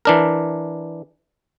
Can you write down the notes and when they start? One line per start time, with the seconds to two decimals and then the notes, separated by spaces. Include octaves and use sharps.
0.05 E3 D4 A#4